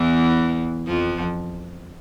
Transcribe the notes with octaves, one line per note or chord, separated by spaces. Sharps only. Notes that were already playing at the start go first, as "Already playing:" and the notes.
Already playing: E2 E3
F2 F3